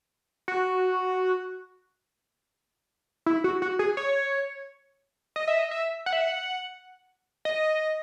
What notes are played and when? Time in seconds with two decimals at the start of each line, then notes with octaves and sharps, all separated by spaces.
0.48 F#4
3.26 E4
3.44 F#4
3.62 F#4
3.79 G#4
3.97 C#5
5.36 D#5
5.47 E5
5.59 D#5
5.71 E5
6.06 F#5
6.13 E5
6.20 F#5
7.45 D#5